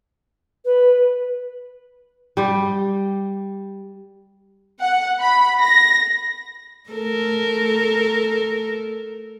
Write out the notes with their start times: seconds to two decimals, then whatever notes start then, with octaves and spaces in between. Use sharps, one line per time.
0.65 B4
2.37 G3 G4
4.81 F#5
5.21 B5
5.61 A#6
6.90 A3 A4 A#4